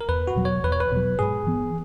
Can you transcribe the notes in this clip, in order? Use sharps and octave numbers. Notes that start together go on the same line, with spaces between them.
A#4
E2 B4
F#4
B2 F#3
C#5
E2 B4
C#5
B4
B2 F#3
G#2 G#4
E3 B3